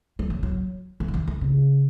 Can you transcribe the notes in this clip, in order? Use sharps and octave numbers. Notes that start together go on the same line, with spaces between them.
F#3
E3
F#3
E3
D#3
E3
D#3
C#3